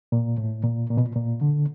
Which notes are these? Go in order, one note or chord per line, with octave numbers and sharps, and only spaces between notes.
A#2
A2
A#2
A#2
B2
A#2
A#2
D3